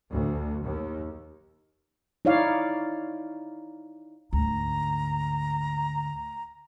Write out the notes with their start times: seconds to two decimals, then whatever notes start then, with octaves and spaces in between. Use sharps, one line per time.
0.11 D2
0.67 D#2
2.25 D#4 E4 C#5 D5 F5
4.33 D2 G#2 A#5